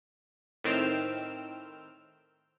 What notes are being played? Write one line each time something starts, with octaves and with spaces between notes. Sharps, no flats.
A2 D#3 C4 G5 E6 F6